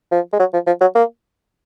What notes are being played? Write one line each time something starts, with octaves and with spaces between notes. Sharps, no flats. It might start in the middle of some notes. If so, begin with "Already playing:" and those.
F3
G#3
F#3
F3
F3
F#3
A#3